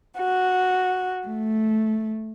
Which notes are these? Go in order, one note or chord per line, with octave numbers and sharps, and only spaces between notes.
F#4
A3